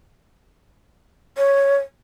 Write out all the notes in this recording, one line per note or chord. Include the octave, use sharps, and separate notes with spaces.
C#5